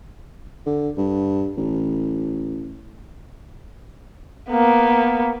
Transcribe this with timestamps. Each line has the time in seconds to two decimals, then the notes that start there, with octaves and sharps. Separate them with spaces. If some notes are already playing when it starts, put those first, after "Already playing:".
0.66 D3
0.97 G2
1.57 A1
4.50 A#3 B3